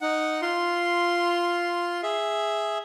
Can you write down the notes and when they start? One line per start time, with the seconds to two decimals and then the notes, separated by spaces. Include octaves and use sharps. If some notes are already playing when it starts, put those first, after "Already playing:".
0.01 D#4 F#5
0.42 F4 C6
2.03 G#4 E5